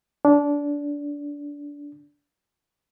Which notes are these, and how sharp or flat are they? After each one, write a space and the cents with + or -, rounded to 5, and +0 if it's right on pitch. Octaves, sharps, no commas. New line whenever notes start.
D4 -20